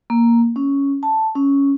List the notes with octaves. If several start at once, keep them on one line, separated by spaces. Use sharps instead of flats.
A#3
C#4
A5
C#4